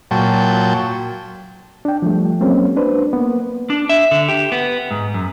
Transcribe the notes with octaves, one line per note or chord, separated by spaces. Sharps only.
A#2 F#3 G5 A5
D4 G5
F3 G3 A3
F#3 G#3 A#3 C4 C#4
D4 B4 C5
A#3 B3
D4
E5
D3
G4
B3
G#2
F#2